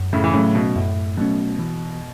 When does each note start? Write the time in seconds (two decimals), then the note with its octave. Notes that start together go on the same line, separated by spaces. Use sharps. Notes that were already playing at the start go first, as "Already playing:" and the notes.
Already playing: F#2
0.13 A2 C#3
0.24 E3
0.34 A2 C#3 F#3 A3 C#4
0.55 B2
0.75 F#2 A2
1.17 B2 F#3 A3 C#4
1.59 E3